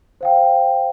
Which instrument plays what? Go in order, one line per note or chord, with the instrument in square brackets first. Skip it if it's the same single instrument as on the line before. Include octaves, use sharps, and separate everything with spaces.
[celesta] C5 F5 G5